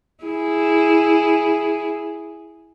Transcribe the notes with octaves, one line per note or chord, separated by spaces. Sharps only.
E4 G#4